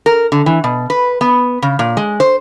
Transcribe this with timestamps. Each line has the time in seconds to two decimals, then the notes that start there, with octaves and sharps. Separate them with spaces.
0.06 A#4
0.32 D3
0.46 E3
0.64 B2
0.90 B4
1.21 B3
1.62 C#3
1.79 A#2
1.97 G#3
2.20 C5